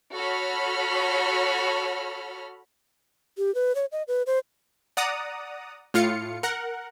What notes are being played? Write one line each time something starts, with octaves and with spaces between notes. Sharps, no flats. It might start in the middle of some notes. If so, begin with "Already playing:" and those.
F#4 A4 C#5 B5 F6
G4
B4
C#5
D#5
B4
C5
D5 F#5 A#5 D#6
A2 F4 F5 C#7
A#4 F#5